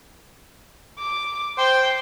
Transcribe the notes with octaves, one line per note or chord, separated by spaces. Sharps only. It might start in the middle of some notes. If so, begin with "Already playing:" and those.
D6
C5 G5